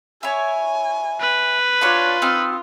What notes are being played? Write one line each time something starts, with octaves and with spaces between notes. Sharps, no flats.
E4 C#5 G#5
B4
D4 F4 C#5 F#5
C4 D#4 F6